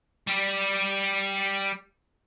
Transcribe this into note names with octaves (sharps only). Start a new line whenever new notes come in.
G3 G4